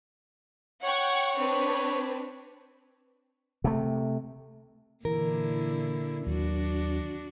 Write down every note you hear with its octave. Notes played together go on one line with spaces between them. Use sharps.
C#5 F#5 G5 C#6
C4 D4 B4
C3 A3
A#2 D3 E3 E4 A#4
D#2 F#3 D4 F#4